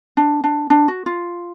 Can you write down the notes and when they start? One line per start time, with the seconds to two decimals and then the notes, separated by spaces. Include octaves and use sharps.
0.17 D4
0.44 D4
0.70 D4
0.88 F#4
1.06 F4